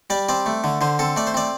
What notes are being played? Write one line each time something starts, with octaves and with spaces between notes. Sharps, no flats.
G3 D5
C4 D5
A3
D3
D3 C5
C4 A4
A3 D5
C5
C4 D5